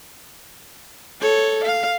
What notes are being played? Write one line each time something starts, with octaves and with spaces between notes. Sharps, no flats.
A4 C#5
F5